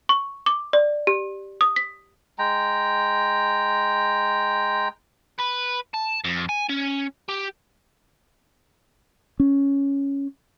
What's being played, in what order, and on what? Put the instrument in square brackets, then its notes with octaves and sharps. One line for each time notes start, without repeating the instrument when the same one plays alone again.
[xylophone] C#6
D6
D5
G4
D#6
B6
[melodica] G#3 G5 A#5
[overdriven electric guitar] B4
A5
F2
G#5
C#4
G4
[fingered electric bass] C#4